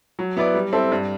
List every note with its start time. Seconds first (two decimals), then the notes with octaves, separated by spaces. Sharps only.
0.19 F#3
0.37 B3 E4 B4 D5
0.54 G3
0.73 C4 E4 A4
0.92 G2